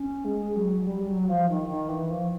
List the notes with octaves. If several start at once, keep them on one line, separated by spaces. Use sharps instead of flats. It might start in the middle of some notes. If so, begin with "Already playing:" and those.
Already playing: C#4
G#3
F#3
F#3
G3
F#3
F3
D#3
D#3
E3
F3